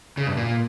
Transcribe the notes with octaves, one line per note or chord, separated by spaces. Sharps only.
C#3
G2
A#2